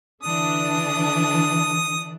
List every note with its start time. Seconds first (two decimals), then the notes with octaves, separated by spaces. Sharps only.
0.23 D3 E3 D4 D#6